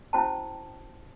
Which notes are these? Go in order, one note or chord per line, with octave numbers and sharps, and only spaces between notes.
C#4 E4 F#4 C5 G5 A5